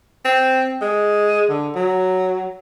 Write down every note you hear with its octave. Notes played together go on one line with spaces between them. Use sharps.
C4
G#3
D3
F#3